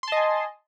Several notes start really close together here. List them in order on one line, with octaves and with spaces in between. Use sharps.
C6 A5 D#5 G#5